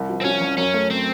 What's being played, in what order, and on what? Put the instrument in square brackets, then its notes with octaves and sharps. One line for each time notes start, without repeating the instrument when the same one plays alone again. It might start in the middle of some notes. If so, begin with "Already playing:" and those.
Already playing: [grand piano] C2
F3
[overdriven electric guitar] C4
[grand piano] F3 [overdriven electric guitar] C#4
[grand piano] C2
[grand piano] F#2 [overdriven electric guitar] C#4
[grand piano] A3
[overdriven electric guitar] C4